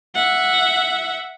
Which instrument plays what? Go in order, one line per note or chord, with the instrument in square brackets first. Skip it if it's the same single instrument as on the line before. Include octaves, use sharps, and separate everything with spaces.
[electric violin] E5 F#5